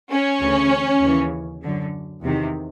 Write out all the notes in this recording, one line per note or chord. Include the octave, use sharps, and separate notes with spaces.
C#4
D2 C#3 E3
D#2 C#3 E3
F#2 D3
E2 C3 D#3